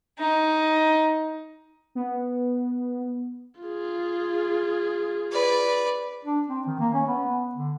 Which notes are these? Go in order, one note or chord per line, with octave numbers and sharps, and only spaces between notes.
D#4
B3
F4 G#4
B4 D5
D4
C4
D#3
A#3
C#4
B3
D3